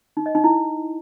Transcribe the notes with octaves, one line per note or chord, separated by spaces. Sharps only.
D#4
D#5
D#4
E4